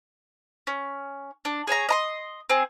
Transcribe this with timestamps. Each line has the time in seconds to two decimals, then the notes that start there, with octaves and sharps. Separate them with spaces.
0.67 C#4
1.45 D4
1.67 G#4 C#5 A5 A#5
1.89 D#5 A#5 C6
2.50 C4 G#4